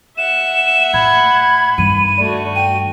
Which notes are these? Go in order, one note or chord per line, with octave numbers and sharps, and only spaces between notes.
E5 F#5 E7
A2 B5 G#6
G2 D#3 D#7
A3 F#4 D5
G5 D#7